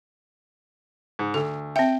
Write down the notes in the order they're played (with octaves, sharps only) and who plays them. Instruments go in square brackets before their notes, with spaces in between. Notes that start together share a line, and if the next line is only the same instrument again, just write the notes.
[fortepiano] G#2
[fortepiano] D2 [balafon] A4
[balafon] C4 E5 [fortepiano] G5